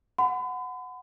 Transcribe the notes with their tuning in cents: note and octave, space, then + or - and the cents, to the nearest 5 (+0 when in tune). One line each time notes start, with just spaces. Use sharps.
F#5 -10 B5 +45